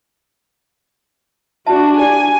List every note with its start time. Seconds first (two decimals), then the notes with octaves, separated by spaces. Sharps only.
1.66 D4 F#4 E5 A5
1.99 E4 G4 D5 G#5